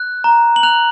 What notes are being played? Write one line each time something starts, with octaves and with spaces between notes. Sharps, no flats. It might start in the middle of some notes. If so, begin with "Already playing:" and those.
Already playing: F#6
A#5
F#7
F#6 F7